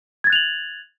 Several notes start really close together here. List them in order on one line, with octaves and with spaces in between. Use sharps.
G#6 A6 F#6 F7 F#7